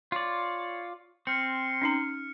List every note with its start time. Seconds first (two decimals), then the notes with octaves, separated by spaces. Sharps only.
0.12 F4 C#5 D5
1.27 C4 C6 F6 C#7
1.82 C#4 D#4 A#5